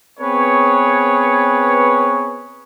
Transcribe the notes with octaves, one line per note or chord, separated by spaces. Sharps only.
B3 C4 G#4 B4 C#5